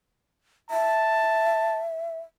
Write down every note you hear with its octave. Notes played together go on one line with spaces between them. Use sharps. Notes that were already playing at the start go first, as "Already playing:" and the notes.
E5 A5